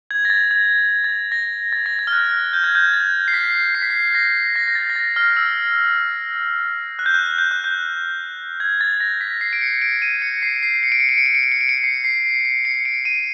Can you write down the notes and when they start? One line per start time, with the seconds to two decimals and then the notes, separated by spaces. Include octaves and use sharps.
0.11 G#6
0.25 A#6
0.30 A6
0.51 G#6
0.78 G#6
1.04 A6
1.32 A#6
1.73 A6
1.86 A#6
1.99 A6
2.07 F6
2.13 F#6
2.53 G6
2.64 G#6
2.75 G6
2.93 A6
3.28 C7
3.34 B6
3.75 C7
3.82 B6
3.90 C7
4.15 A#6
4.56 A#6
4.68 A#6
4.75 A6
4.90 A#6
4.96 A6
5.16 F6
5.37 E6
6.99 F#6
7.06 G6
7.14 F#6
7.38 G6
7.51 F#6
7.64 G6
8.60 G#6
8.81 A6
9.00 A#6
9.21 B6
9.41 C7
9.53 D7
9.61 C#7
9.82 D7
10.02 D#7
10.22 C#7
10.43 C7
10.63 C7
10.83 C#7
10.92 D7
11.00 C#7
11.09 D7
11.18 C#7
11.26 D7
11.35 C#7
11.43 D7
11.52 C#7
11.61 D7
11.69 C#7
11.84 C7
12.04 C7
12.45 C7
12.65 C#7
12.85 D7
13.05 D#7